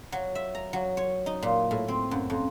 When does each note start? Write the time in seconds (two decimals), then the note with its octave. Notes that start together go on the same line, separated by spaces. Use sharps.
0.12 F#3
0.35 E5
0.55 A#5
0.73 F#3
0.97 C#5
1.26 D#4
1.43 A#2
1.71 A2
1.88 C4
2.11 F#2
2.30 F2